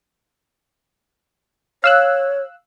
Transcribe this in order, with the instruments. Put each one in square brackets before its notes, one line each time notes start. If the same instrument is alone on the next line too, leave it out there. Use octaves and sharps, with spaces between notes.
[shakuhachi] C#5 [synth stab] F5 E6 F#6